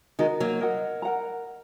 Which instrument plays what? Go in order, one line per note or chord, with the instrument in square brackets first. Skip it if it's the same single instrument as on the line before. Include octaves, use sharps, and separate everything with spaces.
[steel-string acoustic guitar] D#3 G#3 [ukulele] D#4 F#4 A#4
[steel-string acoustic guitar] F#3 A#3
[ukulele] A#4 D#5 F#5
A#4 F#5 A#5